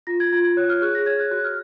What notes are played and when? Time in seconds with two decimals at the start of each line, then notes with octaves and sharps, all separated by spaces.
0.07 F4 A#6
0.20 G#6
0.33 F4 G#6
0.45 G#6
0.57 C#5 F#6
0.70 F6
0.82 G#4 F#6
0.95 A#6
1.06 C#5 G#6
1.20 F#6
1.31 F#4 F#6
1.44 F6